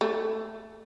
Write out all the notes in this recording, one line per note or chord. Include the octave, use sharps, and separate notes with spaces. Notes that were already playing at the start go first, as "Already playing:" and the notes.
A3